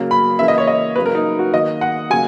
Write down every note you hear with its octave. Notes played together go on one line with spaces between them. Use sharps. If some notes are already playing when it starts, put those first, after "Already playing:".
Already playing: C#3 F#3 A#3
B5
C#3 E3 A#3 E5
D#5
C#5
D#5
C#3 F#3 A#3 B4
A#4
D#4
F#4
D#3 A#3 D#5
F#5
C#3 F#3 A#3 G#5